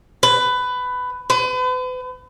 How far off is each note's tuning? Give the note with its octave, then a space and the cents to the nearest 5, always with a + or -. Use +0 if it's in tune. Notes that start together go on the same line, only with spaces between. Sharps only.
B4 +15
B4 +40